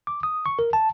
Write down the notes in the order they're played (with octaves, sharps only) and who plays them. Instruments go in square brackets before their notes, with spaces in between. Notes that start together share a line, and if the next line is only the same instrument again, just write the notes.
[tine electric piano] D6
D#6
C#6
A#4
A5